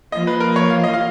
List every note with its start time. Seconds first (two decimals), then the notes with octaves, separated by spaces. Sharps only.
0.12 F3 A#3 F4 D#5
0.27 B4
0.40 A#4
0.56 C#5
0.70 F5
0.84 D#5
0.93 F5